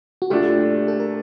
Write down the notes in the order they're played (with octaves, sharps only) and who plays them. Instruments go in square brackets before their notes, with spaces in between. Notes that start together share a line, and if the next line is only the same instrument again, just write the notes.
[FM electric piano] F#4
[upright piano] A#2 A3 D4 [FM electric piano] G4
[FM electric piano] A4
A#4